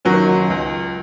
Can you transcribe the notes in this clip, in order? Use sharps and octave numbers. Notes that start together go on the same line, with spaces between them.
F#1 D#3 F#3 C#4
C#2